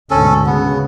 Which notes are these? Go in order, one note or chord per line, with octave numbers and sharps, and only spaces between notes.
D2 G#2 B2 C#4 A4
C#3 B3